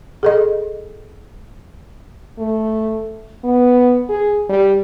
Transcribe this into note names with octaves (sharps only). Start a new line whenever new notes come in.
G#4 A4 D#5
A3
B3
G#4
G3